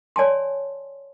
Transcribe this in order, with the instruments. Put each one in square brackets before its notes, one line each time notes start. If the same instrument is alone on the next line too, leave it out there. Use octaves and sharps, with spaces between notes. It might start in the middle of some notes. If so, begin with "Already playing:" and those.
[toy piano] C#5 D5 G#5 A5 C6